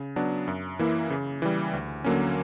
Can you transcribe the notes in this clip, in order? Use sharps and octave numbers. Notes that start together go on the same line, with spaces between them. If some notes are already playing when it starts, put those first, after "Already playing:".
Already playing: C#3
F#3 B3 D4
F#2
E3 A#3 E4
C#3
E3 G3
D2
D3 F#3 A#3 C#4